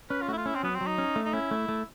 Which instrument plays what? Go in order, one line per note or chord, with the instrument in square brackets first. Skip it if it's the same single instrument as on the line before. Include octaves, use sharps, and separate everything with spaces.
[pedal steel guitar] C#4 [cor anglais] B4
[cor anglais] F4
[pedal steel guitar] A3 [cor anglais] F#4
[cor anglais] E4
F4
[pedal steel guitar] C#4 [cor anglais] E4
[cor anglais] C4
[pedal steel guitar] F#3 [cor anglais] B3
[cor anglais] C4
[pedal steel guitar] F#3
[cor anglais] D#4
[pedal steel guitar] C#4
A3
[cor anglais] D#4
[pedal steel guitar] C#4 [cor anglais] E4
[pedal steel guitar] A3
A3